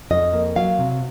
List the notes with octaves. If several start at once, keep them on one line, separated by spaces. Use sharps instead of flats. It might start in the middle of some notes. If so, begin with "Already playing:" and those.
F2 D#5
A#3
F#3 F5
C3